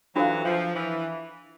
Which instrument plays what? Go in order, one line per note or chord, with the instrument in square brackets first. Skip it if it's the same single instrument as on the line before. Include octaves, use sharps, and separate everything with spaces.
[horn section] E3 F#3 [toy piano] D4 F4 A4 C5 F5
[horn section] F3
E3